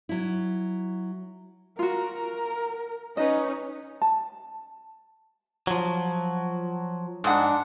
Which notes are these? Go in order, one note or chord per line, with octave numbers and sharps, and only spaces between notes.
F#3 E4
F4 F#4 A#4
C#4 D#4 B4 D#5
A5
F3 F#3
G#2 D4 F#5